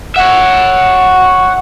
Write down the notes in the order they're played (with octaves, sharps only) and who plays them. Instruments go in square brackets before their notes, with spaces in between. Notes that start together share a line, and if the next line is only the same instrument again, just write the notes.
[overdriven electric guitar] C#5 E5 [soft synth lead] F#5